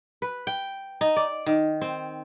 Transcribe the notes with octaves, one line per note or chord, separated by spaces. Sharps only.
B4
G5
D#4
D5
D#3
C4